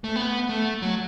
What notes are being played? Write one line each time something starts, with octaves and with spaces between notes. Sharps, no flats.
A3
B3
A3
F#3